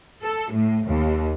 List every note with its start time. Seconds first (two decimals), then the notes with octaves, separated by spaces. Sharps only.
0.23 A4
0.52 A2
0.86 D#2